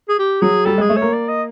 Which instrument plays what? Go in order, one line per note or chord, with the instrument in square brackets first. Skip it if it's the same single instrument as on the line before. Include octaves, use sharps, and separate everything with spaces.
[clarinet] G#4
G4
[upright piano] F#3 [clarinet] G#4
[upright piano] G3 [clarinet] A4
[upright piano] G#3 [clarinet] G#4
[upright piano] A3
[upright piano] A#3 [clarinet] C#5
[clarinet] D5
D#5